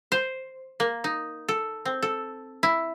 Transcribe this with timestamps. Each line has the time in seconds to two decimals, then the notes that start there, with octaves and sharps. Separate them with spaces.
0.12 C5
0.80 A#3
1.04 D#4
1.48 A4
1.85 C4
2.02 A4
2.63 E4